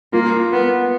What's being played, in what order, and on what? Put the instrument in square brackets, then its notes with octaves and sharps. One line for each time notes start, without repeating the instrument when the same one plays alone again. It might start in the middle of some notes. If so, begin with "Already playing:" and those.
[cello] A#3 [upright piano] F4
[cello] B3